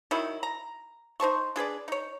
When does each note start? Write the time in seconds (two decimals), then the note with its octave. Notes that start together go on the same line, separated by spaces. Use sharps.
0.11 D#3 F#3 E4
0.43 A#5
1.20 D#4 C5 A5 C#6
1.56 D4 G#4 B4 D5
1.88 D#4 C#5